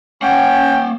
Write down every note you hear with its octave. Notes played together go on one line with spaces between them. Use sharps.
A#3 C#4 F#5 G5